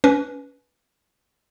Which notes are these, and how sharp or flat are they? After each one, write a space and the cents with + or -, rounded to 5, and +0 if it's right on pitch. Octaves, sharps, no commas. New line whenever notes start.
C#4 +25 B4 -10